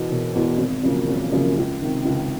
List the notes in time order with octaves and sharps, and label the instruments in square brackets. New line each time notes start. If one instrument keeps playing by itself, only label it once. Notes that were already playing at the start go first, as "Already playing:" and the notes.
Already playing: [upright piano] E1 E2 B2
E1
E2 B2
G#1
F#2 C#3 F3 A#3
G#1
F#2 C#3 F3 A#3
C#2
C3 D#3
C#2